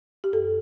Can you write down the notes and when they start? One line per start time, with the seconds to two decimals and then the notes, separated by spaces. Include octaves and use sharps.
0.24 G4
0.33 F#2 A4